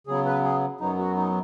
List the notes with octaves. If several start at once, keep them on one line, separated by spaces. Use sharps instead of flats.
C#3 F#3 B3 G#4
B4
G#4
F#2 F#3 B3 D#4
F#4
D#4